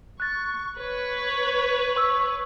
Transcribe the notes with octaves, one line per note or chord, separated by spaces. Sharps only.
C#6 F#6 A6
B4 C#5
C#6 E6